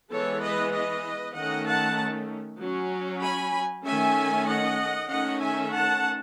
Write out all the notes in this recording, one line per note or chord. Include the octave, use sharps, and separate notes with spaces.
E3 G#3 B3 A4 C#5
B4 D#5
B4 D#5
D#3 A3 C#4 D#5 F#5
F#5 A5
F#3 C#4
G#5 B5
D#3 A3 C#4 E5 G#5
D#5 F#5
D#3 A3 C#4 D#5 F#5
E5 G#5
F#5 A5